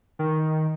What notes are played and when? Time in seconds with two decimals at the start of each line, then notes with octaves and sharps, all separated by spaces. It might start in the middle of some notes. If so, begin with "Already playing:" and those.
0.19 D#3